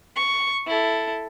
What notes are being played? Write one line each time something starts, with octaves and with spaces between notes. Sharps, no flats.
C#6
E4 A4